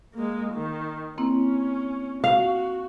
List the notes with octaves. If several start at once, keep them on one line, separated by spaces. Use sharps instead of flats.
G#3 A#3
D#3
A#3 C4 C#4 E4
F#4 F5